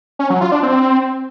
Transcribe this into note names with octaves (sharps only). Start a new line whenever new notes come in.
C#4
F#3
F4
D4
C4